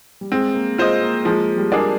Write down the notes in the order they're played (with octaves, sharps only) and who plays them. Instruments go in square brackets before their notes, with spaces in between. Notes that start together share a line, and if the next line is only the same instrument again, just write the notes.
[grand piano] G3
[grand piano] G#3 [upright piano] C4
[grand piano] A#3
[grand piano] G#3 [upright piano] F4 C5 D#5
[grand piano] A#3
[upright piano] F3 [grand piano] G#3
[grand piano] G3
[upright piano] A#3 D4 G#4 D5